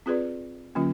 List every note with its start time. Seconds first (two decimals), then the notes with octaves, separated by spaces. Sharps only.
0.06 C4 F4 G#4 B4 D5
0.75 D3 F#3 A#3 C#4 F4